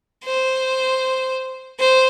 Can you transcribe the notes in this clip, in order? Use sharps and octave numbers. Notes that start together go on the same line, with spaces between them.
C5
C5